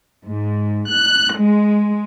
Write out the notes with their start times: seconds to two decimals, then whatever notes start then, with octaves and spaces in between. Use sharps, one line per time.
0.25 G#2
0.94 F#6
1.38 G#3